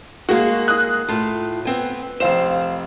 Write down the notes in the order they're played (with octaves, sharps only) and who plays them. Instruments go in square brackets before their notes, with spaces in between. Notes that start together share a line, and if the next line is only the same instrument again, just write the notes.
[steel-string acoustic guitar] G#3 A#3 G#4 [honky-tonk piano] F#4
[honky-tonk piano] D#6 F#6
[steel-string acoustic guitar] A2 F4
B3 C4 G#5
[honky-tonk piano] F1 F5 E7 [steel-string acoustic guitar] C5